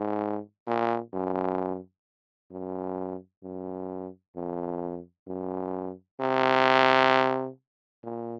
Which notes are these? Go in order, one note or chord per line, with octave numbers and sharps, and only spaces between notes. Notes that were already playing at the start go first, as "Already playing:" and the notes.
Already playing: G#2
A#2
F#2
F#2
F#2
F2
F#2
C3
A#2